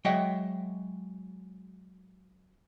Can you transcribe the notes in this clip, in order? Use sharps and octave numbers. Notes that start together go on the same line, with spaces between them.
F#3 G#3 D#5 E5 F#5 G5